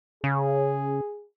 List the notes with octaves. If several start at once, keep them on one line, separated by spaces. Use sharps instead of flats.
C#3 G#4